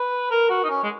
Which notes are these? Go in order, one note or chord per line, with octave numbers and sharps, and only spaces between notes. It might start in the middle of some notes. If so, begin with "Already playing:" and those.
Already playing: B4
A#4
F#4
D#4
C#4
G#3